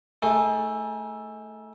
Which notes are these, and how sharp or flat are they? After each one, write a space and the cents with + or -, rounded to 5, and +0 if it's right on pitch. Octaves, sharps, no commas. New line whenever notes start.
A3 +0 D#4 +40 G#4 +0